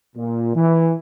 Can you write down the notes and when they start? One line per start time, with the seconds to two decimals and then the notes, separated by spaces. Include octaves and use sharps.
0.16 A#2
0.55 E3